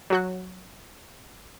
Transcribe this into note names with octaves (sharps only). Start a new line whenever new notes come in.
F#3 F#4 F#6